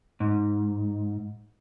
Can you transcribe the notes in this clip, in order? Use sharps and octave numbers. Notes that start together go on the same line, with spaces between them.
G#2